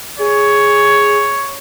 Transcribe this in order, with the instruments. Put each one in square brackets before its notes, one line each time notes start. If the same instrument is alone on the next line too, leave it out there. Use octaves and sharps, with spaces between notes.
[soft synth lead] G#4 [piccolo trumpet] C#5